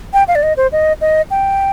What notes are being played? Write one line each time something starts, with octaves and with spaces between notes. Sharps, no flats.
G5
F5
D5
D#5
C5
D#5
D#5
G5